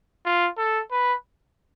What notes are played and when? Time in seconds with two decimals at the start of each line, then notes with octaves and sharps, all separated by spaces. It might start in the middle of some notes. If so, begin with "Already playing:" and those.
0.25 F4
0.58 A4
0.91 B4